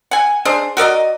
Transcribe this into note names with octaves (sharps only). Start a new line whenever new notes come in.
F#5 G#5
D4 G#4 C5
F#4 A#4 D5 D#5